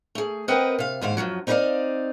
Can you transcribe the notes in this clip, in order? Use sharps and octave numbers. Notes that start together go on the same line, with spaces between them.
A3 G#4
C4 A#4 B4 D#5 F#5 G5
C3 F5
D#2 G#2 C5 F5
F#2 C3 F3 F#3
C4 D#4 A#4 B4 D5 F5